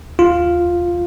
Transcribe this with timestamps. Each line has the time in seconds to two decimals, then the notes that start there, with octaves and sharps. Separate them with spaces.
0.19 F4